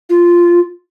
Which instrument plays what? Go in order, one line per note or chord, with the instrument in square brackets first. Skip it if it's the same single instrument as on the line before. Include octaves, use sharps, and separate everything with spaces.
[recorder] F4